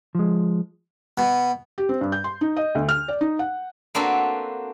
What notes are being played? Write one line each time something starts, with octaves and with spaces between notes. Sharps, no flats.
F3 G#3
B2
G4
C4
G2
G6
C6
D#4
D#5
D2
F6
D5
D#4
F#5
A#3 C4 D4 F#4 A4 B4